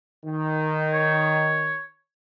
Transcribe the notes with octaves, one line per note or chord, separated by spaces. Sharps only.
D#3
C#5